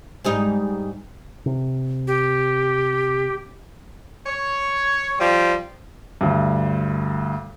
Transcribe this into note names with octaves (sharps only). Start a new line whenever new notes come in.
G#2 G3 D#4
C3
G4
C#5
F3 G3 G4
D2 G2